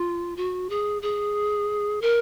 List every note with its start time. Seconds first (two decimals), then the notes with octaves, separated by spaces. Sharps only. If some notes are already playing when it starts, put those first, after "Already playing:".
Already playing: F4
0.37 F#4
0.70 G#4
1.02 G#4
2.02 A#4